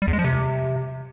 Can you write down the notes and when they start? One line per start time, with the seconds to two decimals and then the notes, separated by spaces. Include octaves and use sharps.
0.02 G3
0.07 E2
0.13 G#3
0.19 F3
0.24 C3